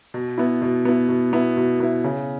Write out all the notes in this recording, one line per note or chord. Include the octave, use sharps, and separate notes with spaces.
B2
B3 E4
B2
B3 E4
B2
B3 E4
B2
B3 E4
C#3